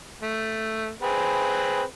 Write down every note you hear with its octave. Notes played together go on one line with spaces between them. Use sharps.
A3
C4 G#4 B4